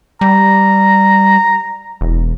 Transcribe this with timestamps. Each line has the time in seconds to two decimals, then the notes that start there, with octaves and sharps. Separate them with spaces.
0.21 G3 A#5
2.01 E1